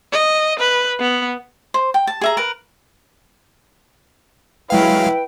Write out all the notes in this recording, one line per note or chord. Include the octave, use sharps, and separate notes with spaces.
D#5
B4
B3
C5
G5
A5
G#4 E5 A#5
A#4 B4
F#3 G#3 E4 B4 F5 G5